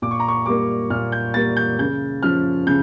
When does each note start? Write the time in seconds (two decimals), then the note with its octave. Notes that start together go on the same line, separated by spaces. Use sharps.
0.02 A#2 D6
0.11 C#6
0.20 A#5
0.28 C#6
0.46 G3 A#3 D6
0.90 A#2 F6
1.12 G6
1.34 G3 A#3 A6
1.57 G6
1.79 C#3 G6
2.23 F3 C#4 F6
2.67 C#3 G6